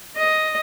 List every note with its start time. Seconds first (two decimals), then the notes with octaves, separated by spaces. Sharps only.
0.17 D#5